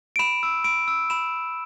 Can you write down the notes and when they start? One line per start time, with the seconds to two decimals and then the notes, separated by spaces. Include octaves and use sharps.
0.16 D7
0.19 B5 E7
0.43 E6
0.64 B5 D7
0.88 E6
1.10 B5 E7